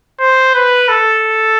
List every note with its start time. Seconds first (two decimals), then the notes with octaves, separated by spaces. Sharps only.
0.20 C5
0.54 B4
0.89 A4